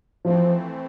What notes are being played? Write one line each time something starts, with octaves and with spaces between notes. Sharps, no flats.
E3 F3 A3 C4